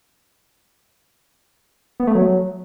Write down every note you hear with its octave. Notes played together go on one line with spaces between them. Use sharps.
B3
A3
F#3